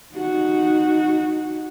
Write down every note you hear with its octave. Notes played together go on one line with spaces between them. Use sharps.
D#4 F#4